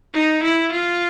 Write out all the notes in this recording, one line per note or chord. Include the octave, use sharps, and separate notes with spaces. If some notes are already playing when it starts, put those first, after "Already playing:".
D#4
E4
F4